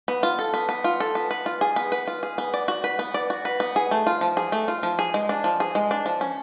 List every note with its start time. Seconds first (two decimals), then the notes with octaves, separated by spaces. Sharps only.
0.08 B3
0.23 F4
0.39 A4
0.54 B3
0.69 B3
0.84 F4
1.00 A4
1.15 B3
1.31 B4
1.46 F4
1.61 G#4
1.76 B3
1.92 B4
2.07 F4
2.23 G#4
2.38 B3
2.54 D5
2.68 F#4
2.84 B4
2.99 B3
3.14 D5
3.30 F#4
3.45 B4
3.60 B3
3.76 G#4
3.91 A3
4.07 F4
4.21 F3
4.37 G#4
4.52 A3
4.68 F4
4.83 F3
4.99 G#4
5.14 G#3
5.29 D4
5.44 F3
5.60 G#4
5.75 G#3
5.91 D4
6.06 F3
6.21 C#4